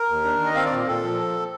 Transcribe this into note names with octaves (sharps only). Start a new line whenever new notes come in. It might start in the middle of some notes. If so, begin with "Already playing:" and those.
Already playing: A#4
D#2
D4
D#3
D#5
C4 F5
D5
A#2
A#2 A4
F3